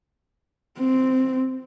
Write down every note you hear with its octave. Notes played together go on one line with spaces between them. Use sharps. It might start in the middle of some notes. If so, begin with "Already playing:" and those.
C4